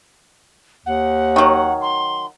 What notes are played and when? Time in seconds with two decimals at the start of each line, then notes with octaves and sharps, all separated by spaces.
0.86 D#2 F#5
1.36 D#3 F#3
1.82 C6